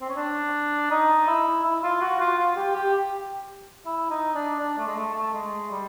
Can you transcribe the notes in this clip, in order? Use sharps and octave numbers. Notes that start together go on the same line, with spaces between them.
C4
C#4
D4
D#4
E4
E4
F4
F#4
F4
F4
G4
G4
E4
D#4
D4
D4
A3
G#3
A3
A3
G#3
G3